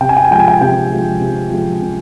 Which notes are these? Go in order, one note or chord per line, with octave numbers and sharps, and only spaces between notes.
C3 G5
G#5
G5
G#5
F3 G#3 G5
G#5
G5
C3 G5
F3 G#3
C3
F3 G#3
C3